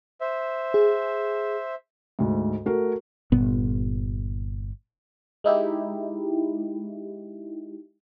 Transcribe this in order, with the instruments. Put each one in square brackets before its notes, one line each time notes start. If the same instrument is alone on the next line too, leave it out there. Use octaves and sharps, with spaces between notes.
[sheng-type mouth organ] C5 E5
[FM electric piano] G#4
[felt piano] D2 G#2
A3 F#4 A#4
[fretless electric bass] G1 A#2 B3
[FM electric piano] G#3 D#4 E4 G4